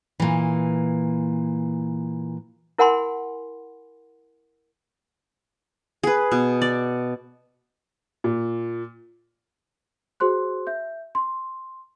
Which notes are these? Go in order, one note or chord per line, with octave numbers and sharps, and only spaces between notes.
A#2 E3
E4 A#4 F#5 G#5 B5 C6
G#4 B4
B2
D5
A#2
F#4 G#4 C5 C6 F#6
E5 G6
C6